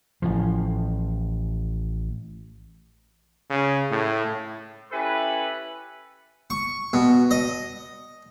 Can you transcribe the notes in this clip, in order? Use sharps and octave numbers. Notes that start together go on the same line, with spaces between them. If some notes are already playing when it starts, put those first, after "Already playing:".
A1 A2 F3
C#3
A2
C#4 E4 G4 A4 B4
C#6
B2
D#5